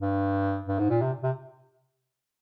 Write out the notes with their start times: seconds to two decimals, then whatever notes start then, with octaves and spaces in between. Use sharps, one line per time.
0.02 G2
0.68 G2
0.79 G#2
0.90 A#2
1.01 C3
1.23 C3